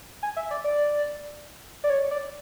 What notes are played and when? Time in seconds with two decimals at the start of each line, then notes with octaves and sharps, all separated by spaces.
0.23 G#5
0.37 E5
0.51 D5
0.64 D5
1.84 D5
1.90 C#5
2.11 D5